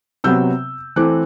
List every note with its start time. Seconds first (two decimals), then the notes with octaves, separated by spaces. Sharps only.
0.24 C3 F#3 B3 E6 G6
0.96 E3 A3 C4 D6 F#6